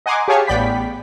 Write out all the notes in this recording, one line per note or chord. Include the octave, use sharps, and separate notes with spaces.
D#5 F#5 G#5 A#5 C6 D6
G4 G#4 C#5 F5 G#5 A5
A1 B3 D5 G5 B5 B6